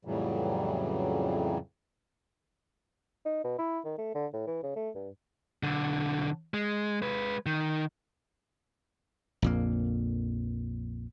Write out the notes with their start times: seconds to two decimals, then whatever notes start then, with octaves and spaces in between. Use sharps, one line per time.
0.05 F2 A2 C#3 E3 F#3 G3
3.25 D#4
3.44 B2
3.58 E4
3.85 D#3
3.98 A3
4.15 D3
4.33 A2
4.47 E3
4.63 C#3
4.76 A3
4.95 G2
5.63 B1 D3
6.54 G#3
7.02 G#3 B4
7.46 D#3
9.42 A#1 F2 A#3